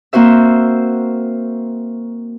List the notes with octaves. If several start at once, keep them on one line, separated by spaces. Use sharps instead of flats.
A#3 C4 F#4 C5 E5